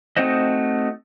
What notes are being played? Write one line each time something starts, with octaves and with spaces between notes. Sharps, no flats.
A3 C4 D#4 F#4 C5 D#5